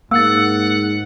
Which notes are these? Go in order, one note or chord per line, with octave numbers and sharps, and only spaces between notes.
G#2 A#3 F#5 E6 A6